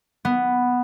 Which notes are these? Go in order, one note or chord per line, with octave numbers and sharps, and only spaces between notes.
B3